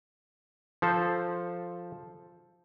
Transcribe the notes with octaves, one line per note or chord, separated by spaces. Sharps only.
F3 A4 C5